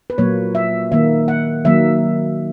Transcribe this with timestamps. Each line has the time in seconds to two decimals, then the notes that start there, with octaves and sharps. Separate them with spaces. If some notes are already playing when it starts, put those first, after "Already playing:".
0.10 B4
0.18 A#2 F#3 A#3 C#5
0.55 E5
0.92 D#3 A#3 E5
1.28 F#5
1.65 D#3 F#3 A#3 E5